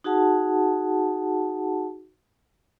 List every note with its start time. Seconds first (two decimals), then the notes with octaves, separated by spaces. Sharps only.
0.04 D#4 F#4 G#4 F#5 A5